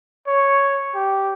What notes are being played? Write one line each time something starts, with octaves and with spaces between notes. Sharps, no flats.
C#5
G4